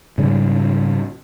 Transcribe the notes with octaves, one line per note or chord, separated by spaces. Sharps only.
G#2 C#3 G3